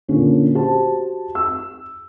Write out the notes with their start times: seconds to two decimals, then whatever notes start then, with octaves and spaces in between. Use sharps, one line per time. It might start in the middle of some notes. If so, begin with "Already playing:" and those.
0.08 A#2 D3 C#4 D4
0.55 F#4 G4 C5 A5
1.35 E6